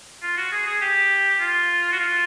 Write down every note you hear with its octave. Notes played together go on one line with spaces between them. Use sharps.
F4
F#4
G#4
G#4
G4
F4
F#4
F4